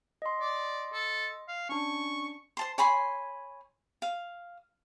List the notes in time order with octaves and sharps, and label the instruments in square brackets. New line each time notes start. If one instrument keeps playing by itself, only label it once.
[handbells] D#5 C6
[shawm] D5
A4
F5
[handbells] C#4 D4 [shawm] C#6
[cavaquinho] C5 A5 C6
C#5 G#5 B5 C6
F5